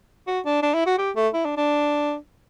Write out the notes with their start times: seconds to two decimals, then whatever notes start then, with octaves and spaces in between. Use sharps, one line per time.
0.27 F#4
0.46 D4
0.63 D4
0.74 E4
0.87 F#4
0.98 G4
1.16 A3
1.34 E4
1.45 D4
1.57 D4